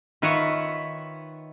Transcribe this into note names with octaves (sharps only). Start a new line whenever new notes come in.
D#3 F4 B4 C#5 E5 F#5